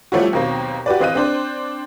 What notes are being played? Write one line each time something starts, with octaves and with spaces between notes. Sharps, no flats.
F3 G3 A3 C#4 E4 F#4
D#2 B2 F#3 A#3 C4
F#4 G4 B4 D5
E3 C4 D#5 F5 F#6 D#7
C4 D4 C5